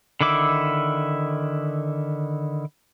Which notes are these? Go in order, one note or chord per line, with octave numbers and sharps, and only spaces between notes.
D3 D#3 E4 D6